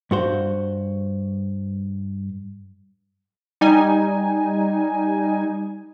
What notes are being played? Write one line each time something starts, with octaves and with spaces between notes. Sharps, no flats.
G2 F#4 C5
G3 D#4 G#5